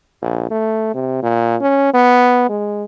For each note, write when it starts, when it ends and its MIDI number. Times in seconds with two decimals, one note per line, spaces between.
0.22 0.49 34
0.51 0.94 57
0.94 1.21 48
1.23 1.56 46
1.61 1.91 61
1.94 2.47 59
2.49 2.84 56